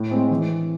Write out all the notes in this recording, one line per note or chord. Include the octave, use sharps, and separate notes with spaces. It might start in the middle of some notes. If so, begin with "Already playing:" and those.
Already playing: A2
G#3 C4
E3